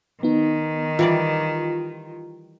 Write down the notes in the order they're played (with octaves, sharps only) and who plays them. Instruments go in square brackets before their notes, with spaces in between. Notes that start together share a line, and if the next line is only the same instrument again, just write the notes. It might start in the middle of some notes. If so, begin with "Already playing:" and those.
[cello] D#3 [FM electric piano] B3 D#4
[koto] E3 G3 D5 [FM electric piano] F4